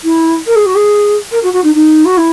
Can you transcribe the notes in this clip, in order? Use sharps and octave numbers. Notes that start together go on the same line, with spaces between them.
E4
A#4
G#4
F#4
G#4
A#4
F#4
F#4
D#4
D#4
F#4
E4